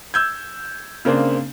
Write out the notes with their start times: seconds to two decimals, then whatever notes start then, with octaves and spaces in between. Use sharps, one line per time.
0.14 E6 G6 G#6
1.05 C#3 A#3 C4 D4